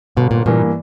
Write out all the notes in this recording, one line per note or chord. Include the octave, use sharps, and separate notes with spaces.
G1 B2
A#2
G2 A#2 E3 A#3